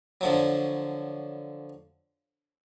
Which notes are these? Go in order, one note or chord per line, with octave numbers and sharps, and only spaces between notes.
D3 F3 F#3